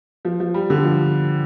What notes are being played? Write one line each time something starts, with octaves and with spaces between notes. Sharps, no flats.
F3
F3
G3
D3
F3